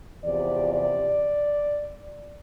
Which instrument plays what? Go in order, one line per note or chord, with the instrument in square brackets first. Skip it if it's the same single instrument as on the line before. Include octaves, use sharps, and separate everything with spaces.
[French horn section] E2 C3 F3 D5
D5